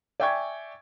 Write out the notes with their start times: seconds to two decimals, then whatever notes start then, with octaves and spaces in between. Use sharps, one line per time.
0.20 D5 E5 G5 G#5 C#6 G#6